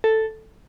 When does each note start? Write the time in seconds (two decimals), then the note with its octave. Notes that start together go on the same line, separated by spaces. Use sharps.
0.04 A4